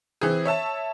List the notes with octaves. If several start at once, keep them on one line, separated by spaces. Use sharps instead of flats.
E3 C4 G#4
C#5 E5 A5